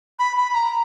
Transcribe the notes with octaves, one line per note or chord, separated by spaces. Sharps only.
B5
B5
A#5